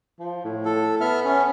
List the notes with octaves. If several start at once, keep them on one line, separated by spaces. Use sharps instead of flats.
F3
A2
A4
B3 E5 F6
C#4